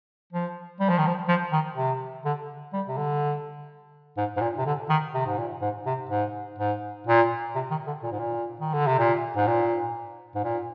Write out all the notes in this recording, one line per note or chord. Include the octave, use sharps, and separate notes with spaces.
F3
G3
F3
D#3
F3
F3
D#3
C3
D3
G3
C3
D3
G#2
G#2
A#2
C3
D3
D#3
C3
G#2
A#2
G#2
C3
G#2
G#2
A#2
C3
D#3
D3
A#2
G#2
A#2
D#3
D3
C3
A#2
G#2
A#2
G#2
A#2